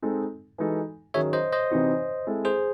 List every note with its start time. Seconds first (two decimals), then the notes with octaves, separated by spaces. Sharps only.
0.02 G#3 C4 D#4 A4
0.58 E3 G#3 D#4 F#4 A4
1.14 D#3 F#3 C#4 G#4 C#5 E5
1.33 C5 D#5
1.52 C5 D#5
1.71 C3 E3 C4 D#4 F#4
2.27 G#3 C4 E4 A4
2.45 G#4 C5